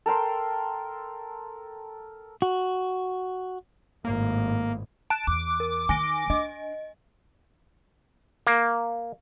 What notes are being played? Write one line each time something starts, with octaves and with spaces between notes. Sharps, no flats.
A4 A#4 G5 C6
F#4
G#1 A2 A#3
A5 F#6 D7
E2 D6
A#4
D#3 G#5 A#6 D7
D4 D#5
A#3